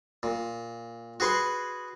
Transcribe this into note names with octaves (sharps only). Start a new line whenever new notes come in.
A#2
F#4 G#4 B4 C6